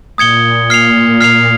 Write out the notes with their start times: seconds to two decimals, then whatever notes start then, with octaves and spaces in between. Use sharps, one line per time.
0.18 A#2 D#6 G#6 C#7 G7
0.70 F6 C7 F7
1.21 F6 C7 F7